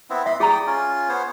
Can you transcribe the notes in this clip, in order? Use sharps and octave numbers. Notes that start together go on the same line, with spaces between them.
B3 C4 E4
E5 B5 C6
G#4 D5 G5 A#5 D#6
C#4 F4
B3 C5 C#5